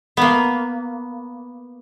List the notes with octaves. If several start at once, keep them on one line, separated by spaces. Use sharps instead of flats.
A#3 B3